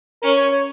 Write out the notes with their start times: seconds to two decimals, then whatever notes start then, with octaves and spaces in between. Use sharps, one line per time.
0.22 C#4 A#4
0.37 C#5
0.52 C#5